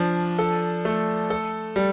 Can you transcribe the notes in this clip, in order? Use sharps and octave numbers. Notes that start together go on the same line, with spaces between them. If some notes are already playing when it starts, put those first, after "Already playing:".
Already playing: F3 D4
A4
A3
A4
G3